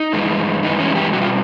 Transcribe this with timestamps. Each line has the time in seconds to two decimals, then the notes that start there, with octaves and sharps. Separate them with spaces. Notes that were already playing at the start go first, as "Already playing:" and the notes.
Already playing: D#4
0.13 G2 E3 G#3
0.62 G2 E3 G#3 D#4
0.80 C#4
0.95 G4
1.13 B2 G3 F#4
1.22 F4